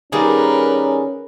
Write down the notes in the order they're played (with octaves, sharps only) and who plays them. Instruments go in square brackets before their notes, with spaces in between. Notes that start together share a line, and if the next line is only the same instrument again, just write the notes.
[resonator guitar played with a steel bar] D#3 G3 A#3 [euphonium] C#4 [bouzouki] G#4 [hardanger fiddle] A#4 B4